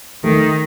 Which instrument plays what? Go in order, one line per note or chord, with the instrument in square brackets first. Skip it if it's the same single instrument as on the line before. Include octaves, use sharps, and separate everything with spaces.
[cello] D#3 [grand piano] A3